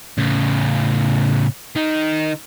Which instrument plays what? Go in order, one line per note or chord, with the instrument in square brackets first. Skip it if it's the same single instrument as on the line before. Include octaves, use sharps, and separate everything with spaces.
[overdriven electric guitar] A2 C#3
D#3 D#4